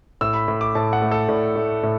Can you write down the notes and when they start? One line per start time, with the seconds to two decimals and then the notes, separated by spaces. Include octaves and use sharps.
0.21 A2 E6
0.34 B5
0.48 A2
0.61 D6
0.75 A2 A5
0.93 F#5
1.02 A3
1.11 A4
1.29 A2 D5
1.56 A3
1.83 A2